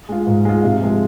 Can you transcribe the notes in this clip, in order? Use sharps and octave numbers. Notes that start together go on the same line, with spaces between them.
G#3 F4
G#2
G#3 F4
C3
F3 G#3